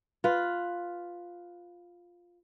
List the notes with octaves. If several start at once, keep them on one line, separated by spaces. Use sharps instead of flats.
F4 B4